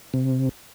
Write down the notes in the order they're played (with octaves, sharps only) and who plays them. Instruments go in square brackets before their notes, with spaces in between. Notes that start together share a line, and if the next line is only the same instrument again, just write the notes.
[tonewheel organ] C3